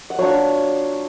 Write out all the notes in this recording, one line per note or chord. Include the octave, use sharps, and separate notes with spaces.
F#5
F#3 B3 D4 F4 C#5 F5